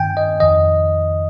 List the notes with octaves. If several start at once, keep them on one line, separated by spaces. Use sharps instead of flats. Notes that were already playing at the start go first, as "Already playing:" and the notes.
Already playing: G2 D#3 G5 G#5
D#5
F2 D#3 D#5